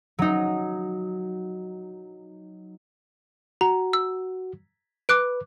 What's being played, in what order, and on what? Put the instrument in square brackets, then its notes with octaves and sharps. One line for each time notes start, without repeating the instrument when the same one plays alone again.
[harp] F#3 D#4
[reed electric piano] F#4 [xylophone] A#5
[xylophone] E6
[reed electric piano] B4 [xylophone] D6 F#6 D7